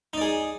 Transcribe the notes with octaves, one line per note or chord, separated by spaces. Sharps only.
D#4 G#4 D5